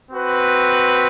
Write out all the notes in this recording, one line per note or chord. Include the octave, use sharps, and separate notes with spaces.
C4 F#4 B4